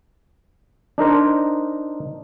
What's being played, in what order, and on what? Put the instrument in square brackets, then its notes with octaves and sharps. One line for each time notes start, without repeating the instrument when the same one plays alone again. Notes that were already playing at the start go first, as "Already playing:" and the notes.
[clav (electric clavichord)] D4 D#4 A#4 C5